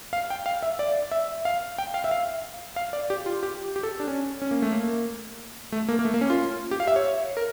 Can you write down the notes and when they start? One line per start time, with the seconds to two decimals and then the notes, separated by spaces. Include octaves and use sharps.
0.13 F5
0.30 G5
0.46 F5
0.63 E5
0.79 D5
1.11 E5
1.45 F5
1.78 G5
1.94 F5
2.04 E5
2.11 F5
2.76 F5
2.93 D5
3.10 G4
3.26 F4
3.43 G4
3.76 G4
3.83 A4
4.00 D4
4.07 C#4
4.42 C#4
4.51 A#3
4.62 A3
4.72 A#3
5.72 A3
5.89 A#3
5.99 A#3
6.05 A3
6.14 A#3
6.21 C#4
6.30 F4
6.71 G4
6.80 F5
6.88 E5
6.96 C#5
7.37 A#4